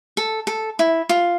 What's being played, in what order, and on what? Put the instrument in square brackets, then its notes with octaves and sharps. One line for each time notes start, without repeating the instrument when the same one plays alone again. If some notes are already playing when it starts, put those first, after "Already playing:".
[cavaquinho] A4
A4
E4
F4